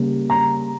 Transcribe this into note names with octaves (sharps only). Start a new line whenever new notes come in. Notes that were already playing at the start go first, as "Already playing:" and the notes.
Already playing: C#3 G3 A#3
A#5